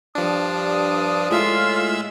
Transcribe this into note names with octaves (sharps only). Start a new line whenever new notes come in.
G2 F3 G3 D4 D#6
A2 G#3 F4 E5 E6